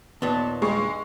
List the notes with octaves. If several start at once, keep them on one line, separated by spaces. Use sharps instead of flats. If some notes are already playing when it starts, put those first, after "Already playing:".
D#2 A#2 B3 A5
G2 G3 G#3 C#6